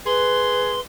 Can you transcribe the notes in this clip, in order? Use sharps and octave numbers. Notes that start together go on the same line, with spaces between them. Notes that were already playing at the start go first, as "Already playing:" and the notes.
G#4 B4 C6